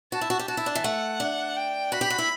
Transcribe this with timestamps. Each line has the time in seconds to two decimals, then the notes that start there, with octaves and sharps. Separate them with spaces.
0.12 F#4 A5
0.21 E4
0.30 F#4
0.39 G4
0.48 F#4 A5
0.57 E4
0.66 D4
0.75 E3
0.84 A3 F#5
1.20 D4
1.56 G5
1.92 F#4 B5
2.01 G4
2.10 F#4
2.18 E4